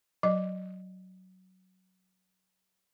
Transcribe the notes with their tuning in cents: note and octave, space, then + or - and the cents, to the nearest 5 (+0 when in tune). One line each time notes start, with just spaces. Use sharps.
F#3 +10 D#5 -10